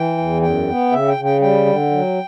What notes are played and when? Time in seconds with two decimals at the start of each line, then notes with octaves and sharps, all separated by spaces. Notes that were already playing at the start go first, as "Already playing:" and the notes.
Already playing: E3 G5
0.18 E2
0.42 F#2 G5
0.67 B3
0.92 C#3 E5
1.08 G5
1.17 C#3
1.25 G5
1.41 G3 G5
1.66 D3
1.91 F#3